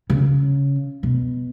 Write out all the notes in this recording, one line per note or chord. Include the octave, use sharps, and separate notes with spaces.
C#3
B2